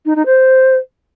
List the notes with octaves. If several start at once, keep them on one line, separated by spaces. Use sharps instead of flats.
D#4
D#4
C5